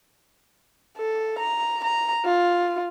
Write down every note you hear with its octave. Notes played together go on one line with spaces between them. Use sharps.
A4
A#5
A#5
F4